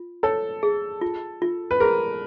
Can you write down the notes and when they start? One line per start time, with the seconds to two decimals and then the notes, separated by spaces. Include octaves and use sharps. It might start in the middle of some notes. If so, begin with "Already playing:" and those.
Already playing: F4
0.23 A4 C#5
0.63 G#4
1.01 F4
1.42 F4
1.71 B4
1.80 G#4 A#4